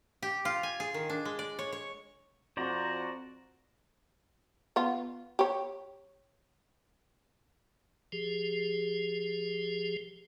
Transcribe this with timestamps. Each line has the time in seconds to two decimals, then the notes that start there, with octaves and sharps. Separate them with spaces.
0.23 G4
0.45 F4
0.63 G#5
0.80 G#4
0.94 D#3
1.10 D4
1.25 G#3
1.39 D5
1.59 C#5
1.72 C#5
2.57 F2 F#4 C5 D5 A#5
4.76 B3 F4
5.39 G4 C#5
8.12 F3 G4 G#4